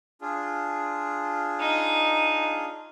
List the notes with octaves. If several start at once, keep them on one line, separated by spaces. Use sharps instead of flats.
D4 F4 G#4
D#4